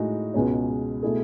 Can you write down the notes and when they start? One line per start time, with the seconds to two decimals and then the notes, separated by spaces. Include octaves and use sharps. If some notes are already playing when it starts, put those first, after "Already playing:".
Already playing: A2 G#3 D#4 F#4
0.34 C#2 B2 G#3 C#4
1.03 B2 A3 E4 G#4